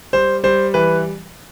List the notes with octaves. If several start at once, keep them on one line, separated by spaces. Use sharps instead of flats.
G3 C5
G3 C5
E3 B4